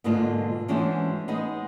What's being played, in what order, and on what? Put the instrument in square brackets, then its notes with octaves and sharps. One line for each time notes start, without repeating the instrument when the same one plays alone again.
[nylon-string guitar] G#2 B2 D3 A#3 D4 F4
E3 G#3 C#4 D4 F#4 C5
G#3 B3 D#4